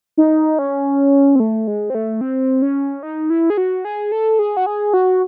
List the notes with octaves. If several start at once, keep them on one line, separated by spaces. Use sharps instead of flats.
D#4
C#4
C4
A3
G#3
C4
A3
C4
C#4
D#4
E4
G#4
F#4
G#4
A4
G#4
F#4
G#4
F#4